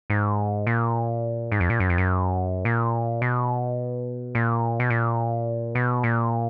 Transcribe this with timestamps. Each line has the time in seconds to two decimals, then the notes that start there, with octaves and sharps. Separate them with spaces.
0.10 G#2
0.67 A#2
1.52 G#2
1.60 F2
1.70 A#2
1.80 F#2
1.90 F2
1.98 F#2
2.65 A#2
3.22 B2
4.35 A#2
4.80 B2
4.90 A#2
5.75 B2
6.04 A#2